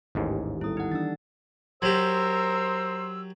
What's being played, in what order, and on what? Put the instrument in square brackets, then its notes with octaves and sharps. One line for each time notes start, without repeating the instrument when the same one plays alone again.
[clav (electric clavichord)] A1 D#2 G#2 [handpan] D#3 G4
[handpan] G3 B3 A4 [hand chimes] E4 D#6
[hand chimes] D#4 F#5
[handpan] E3 D4 [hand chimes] E6 A6
[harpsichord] F#3 G4 [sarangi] A#4 [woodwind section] C5 C6 E6